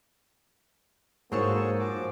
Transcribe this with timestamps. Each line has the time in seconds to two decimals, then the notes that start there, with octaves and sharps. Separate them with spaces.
1.32 G#2 A#3 F#4 G#4 A4 C5 C#5 A5
1.80 F3 F#4 D6